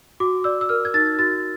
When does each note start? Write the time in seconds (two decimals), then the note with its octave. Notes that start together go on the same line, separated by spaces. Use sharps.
0.20 F#4 D6
0.44 D5 E6
0.61 E6
0.69 A#4 F6
0.85 G#6
0.94 D#4 A6
1.19 F#4 A6